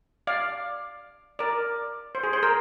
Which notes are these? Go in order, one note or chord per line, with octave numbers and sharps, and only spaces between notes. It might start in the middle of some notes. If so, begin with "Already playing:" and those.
D5 F5
A#4 D5
C5
G#4
C5
A#4